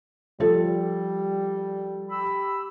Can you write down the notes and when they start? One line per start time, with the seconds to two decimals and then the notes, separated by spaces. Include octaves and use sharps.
0.40 F3 G3 A4
2.09 G4 B5 E6